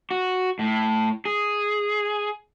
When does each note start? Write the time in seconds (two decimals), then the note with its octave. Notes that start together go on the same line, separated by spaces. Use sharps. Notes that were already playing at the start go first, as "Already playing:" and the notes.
0.11 F#4
0.59 A2
1.25 G#4